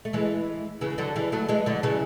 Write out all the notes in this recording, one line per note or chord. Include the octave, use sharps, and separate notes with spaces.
A3
E3 G#3
C#3 E3
D3 F#3
E3 G#3
F#3 A3
E3 G#3
D3 F#3
C#3 E3